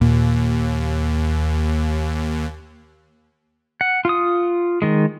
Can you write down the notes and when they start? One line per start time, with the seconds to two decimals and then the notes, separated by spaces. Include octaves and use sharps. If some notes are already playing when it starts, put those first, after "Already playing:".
0.01 D#2 A#2
3.81 F#5
4.05 F4 D#6
4.82 D#3 G#3